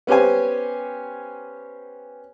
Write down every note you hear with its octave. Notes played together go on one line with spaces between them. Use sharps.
B3 C#4 G4 C5 G#5